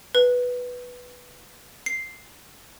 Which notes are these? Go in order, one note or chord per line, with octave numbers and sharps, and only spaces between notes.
B4
C7